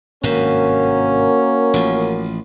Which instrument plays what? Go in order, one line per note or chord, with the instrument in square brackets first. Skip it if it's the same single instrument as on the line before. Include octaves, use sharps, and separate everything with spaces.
[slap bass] G#1 G2 C3 [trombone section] A#3 F#4 A#4 [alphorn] C#4
[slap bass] A1 F3